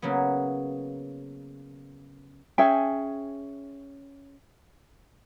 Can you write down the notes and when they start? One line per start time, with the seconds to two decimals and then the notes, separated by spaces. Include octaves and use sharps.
0.02 C#3 F#3 A#3 B3
2.58 C#4 G#4 E5 G5